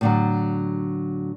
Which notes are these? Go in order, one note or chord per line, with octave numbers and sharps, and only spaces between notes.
A2 D3 F#3